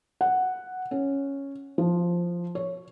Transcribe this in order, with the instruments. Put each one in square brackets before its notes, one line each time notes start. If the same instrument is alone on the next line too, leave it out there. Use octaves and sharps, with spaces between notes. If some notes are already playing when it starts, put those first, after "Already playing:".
[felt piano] F#5
C#4
F3
C#5